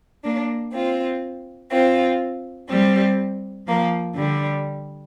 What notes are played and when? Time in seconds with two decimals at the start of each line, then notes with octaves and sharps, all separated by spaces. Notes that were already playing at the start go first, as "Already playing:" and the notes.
0.24 A#3 D4
0.73 C4 F4
1.71 C4 F4
2.69 G3 C4
3.67 F3 A#3
4.16 D3 G3